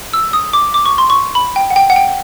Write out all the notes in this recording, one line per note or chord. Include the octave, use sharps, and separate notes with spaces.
E6
D#6
D6
D6
C#6
C6
C#6
B5
G5
F#5
G5
F#5
G5